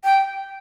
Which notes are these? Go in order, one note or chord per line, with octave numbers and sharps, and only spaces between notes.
G5